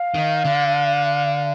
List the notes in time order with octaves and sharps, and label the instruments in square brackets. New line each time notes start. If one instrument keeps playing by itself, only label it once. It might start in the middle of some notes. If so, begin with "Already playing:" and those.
Already playing: [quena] F5
[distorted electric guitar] D#3
D3